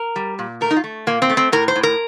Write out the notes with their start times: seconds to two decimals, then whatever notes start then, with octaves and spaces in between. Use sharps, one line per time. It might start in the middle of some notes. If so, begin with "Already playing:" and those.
Already playing: A#4
0.16 G3
0.39 A#2
0.61 A3 A#4
0.71 D#4
0.76 F4
0.84 A3
1.07 A#2 A#3
1.22 C4
1.30 A3
1.37 C4
1.52 A2 A#4
1.68 C5
1.76 A2
1.83 A#4